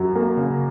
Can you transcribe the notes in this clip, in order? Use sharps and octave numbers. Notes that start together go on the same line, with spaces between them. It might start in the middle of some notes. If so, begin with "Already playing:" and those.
Already playing: F#2 F#3
A#3
C#3